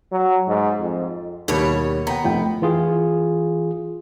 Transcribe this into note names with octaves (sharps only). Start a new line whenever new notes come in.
F#3
G#2
F2
D#2 B2 G3 C#5
B3 G5 A#5
F1 G5
E3 F4 G#4